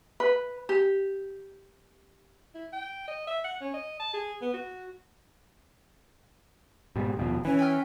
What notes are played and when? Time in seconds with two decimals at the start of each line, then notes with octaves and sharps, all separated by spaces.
0.20 B4
0.69 G4
2.55 E4
2.73 G5
3.08 D#5
3.27 E5
3.44 F#5
3.61 C#4
3.74 D#5
4.00 A5
4.14 G#4
4.42 B3
4.54 F#4
6.96 G#2 B2 G3
7.17 D#1 B2 F3
7.45 E3 C#4
7.59 B4 G5 F6